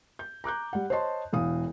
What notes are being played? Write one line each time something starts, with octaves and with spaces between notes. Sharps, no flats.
G6
A#5 D6 F#6 G6
G3 F#5
C5 C#5 D#5 A5 C6
E1 E3 F5 D#6